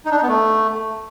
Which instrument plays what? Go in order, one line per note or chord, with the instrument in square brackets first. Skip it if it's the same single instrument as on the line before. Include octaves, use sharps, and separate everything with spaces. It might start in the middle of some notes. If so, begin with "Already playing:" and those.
[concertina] D#4
D4
D#4
B3
A3